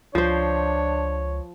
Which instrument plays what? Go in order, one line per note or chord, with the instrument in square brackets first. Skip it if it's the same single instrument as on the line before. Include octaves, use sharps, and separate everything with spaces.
[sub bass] C#2 [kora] F3 C5 [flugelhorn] D4 [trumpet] C#5